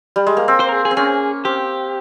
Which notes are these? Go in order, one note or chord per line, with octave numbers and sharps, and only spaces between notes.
G3
G#3
A#3
C4
C5
A#4
G#4
G#4
C4
C#4 G#4
C4 G4